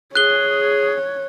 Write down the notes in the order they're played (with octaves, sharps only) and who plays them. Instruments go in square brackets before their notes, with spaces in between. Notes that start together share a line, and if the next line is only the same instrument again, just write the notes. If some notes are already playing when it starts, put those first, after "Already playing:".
[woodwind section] G#4 [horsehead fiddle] C#5 [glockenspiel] F#6 G7